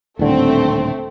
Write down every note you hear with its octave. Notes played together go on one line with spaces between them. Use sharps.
D#1 A2 D3 A3 C4